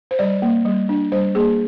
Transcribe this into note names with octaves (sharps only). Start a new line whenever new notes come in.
C5
G3 D5
A#3
G3
D4
G3 C5
A#3 G#4